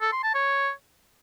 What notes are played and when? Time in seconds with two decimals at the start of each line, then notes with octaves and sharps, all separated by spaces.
0.01 A4
0.12 C6
0.23 A5
0.34 C#5